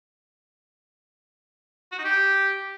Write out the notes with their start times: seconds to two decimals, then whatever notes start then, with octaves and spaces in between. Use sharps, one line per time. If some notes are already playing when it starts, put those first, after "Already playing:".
1.92 F#4
1.98 D#4
2.05 G4